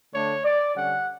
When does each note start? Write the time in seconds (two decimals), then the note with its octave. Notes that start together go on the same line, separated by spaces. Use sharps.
0.14 D3 A3 D4 C#5
0.44 D5
0.75 D3 G3 C#4 F#5